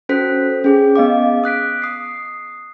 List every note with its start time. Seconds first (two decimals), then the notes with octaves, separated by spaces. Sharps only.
0.09 C#4 F#4 A4 C5 F#6 B6
0.64 C#4 G#4 D6
0.96 B3 D#5 F5 D6
1.44 D#6 F#6 B6 D7
1.82 D#6 C7